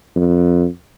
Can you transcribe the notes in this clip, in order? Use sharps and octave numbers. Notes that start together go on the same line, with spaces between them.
F2